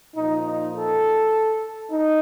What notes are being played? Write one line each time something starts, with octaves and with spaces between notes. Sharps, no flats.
A#2 F3 D#4
D#4
A4
D#4